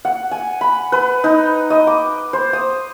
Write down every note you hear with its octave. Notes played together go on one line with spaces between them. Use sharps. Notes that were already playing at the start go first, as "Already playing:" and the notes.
F#5
G#5
B5
B4
D#4
D#5
D6
C5
D#6